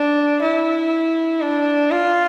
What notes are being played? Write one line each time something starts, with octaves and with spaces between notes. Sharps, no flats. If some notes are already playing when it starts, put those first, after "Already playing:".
Already playing: D4
E4
D4
F4